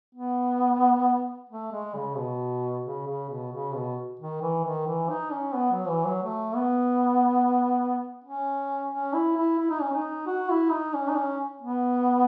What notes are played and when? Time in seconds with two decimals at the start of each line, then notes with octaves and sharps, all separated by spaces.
0.15 B3
1.49 A3
1.72 G#3
1.95 C#3
2.17 B2
2.84 C#3
3.07 C#3
3.30 B2
3.52 C#3
3.74 B2
4.20 D#3
4.42 E3
4.65 D#3
4.87 E3
5.10 D#4
5.32 C#4
5.54 B3
5.71 F#3
5.88 E3
6.05 F#3
6.22 A3
6.56 B3
8.24 C#4
8.91 C#4
9.14 E4
9.37 E4
9.59 E4
9.70 D#4
9.81 C#4
9.93 D#4
10.27 F#4
10.50 E4
10.71 D#4
10.94 C#4
11.09 D#4
11.17 C#4
11.62 B3